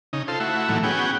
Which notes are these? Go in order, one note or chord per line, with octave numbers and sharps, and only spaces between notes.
C#3 D#4
F4 A4 C5
A3 E4 F#4
A2 D#3 E3 F#3 A3 A#3
B3 C#4 F#4 G#4 G5